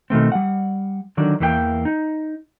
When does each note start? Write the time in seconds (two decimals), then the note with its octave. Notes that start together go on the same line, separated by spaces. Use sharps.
0.10 B2 D#3 A3 C4
0.32 G3 F#5
1.17 D3 D#3 F#3 D4
1.40 E2 E3 A#3 E4 G5
1.85 D#4